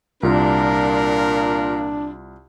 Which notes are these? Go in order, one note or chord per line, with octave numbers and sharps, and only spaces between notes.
C2 A#2 D4 F4 A#4